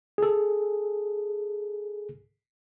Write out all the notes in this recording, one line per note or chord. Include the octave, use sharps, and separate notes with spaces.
G#4 A4